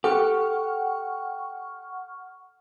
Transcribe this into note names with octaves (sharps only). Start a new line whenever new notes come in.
G4 A4 F#5 C#6 F6